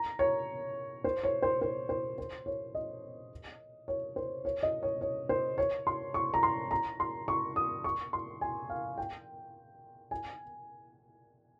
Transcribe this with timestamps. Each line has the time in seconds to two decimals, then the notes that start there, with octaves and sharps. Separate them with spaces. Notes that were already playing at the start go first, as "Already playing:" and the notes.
Already playing: A#5
0.19 C#5
1.04 C5
1.24 C#5
1.43 C5
1.62 C5
1.89 C5
2.18 C5
2.46 C#5
2.75 D#5
3.88 C#5
4.16 C5
4.45 C#5
4.63 D#5
4.83 C#5
5.01 C#5
5.29 C5
5.58 C#5
5.87 C6
6.14 C#6
6.34 A#5
6.43 C6
6.71 A#5
7.00 C6
7.28 C#6
7.56 D#6
7.84 C#6
8.13 C6
8.41 G#5
8.70 F5
8.98 G5
10.11 G#5